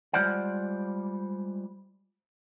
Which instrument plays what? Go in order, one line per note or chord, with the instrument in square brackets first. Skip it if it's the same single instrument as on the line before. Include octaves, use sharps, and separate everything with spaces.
[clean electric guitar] G3 G#3 F4 C5 D5 F#5